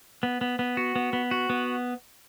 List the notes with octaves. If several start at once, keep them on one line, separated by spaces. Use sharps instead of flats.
B3
B3
B3
F#4
B3
B3
F#4
B3